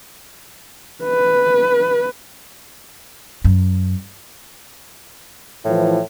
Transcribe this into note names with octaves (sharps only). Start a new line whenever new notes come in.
B4
F#2
A2 E3 F3